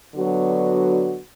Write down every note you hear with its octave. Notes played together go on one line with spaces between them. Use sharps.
D3 F#3 B3 D4 F#4